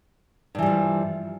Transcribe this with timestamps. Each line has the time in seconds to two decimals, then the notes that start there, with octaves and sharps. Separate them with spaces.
0.55 G2
0.59 E3
0.62 G3
0.66 F3